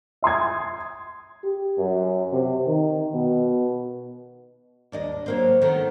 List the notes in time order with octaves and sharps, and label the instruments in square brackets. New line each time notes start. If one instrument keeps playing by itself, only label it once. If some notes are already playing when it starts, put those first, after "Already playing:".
[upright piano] E5 C6 D#6 G#6
[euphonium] G4
F#2
C3
D#3
B2
[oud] D#2 D4 D#5
F#3 A#3 C4
D#3 A3 B3